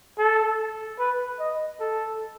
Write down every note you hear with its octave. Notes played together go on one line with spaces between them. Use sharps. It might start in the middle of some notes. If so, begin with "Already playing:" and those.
A4
B4
D#5
A4